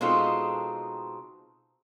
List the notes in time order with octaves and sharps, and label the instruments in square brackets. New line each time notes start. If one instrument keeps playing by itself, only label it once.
[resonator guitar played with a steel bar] B2 G#3 C4 D#4 F4 A4